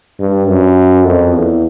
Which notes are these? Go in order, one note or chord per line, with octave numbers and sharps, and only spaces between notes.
G2
F#2
F2
E2